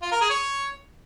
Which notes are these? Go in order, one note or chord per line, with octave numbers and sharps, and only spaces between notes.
F4
A#4
G#4
C#5